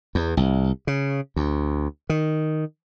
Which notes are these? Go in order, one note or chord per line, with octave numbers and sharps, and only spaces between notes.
E2
C2
C#3
D2
D#3